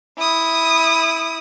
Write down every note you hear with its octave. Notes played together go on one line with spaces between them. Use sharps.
E4 D#6